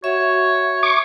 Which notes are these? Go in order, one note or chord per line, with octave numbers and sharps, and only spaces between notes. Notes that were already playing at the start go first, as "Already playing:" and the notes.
F#4 C#5 E5
C#6 D6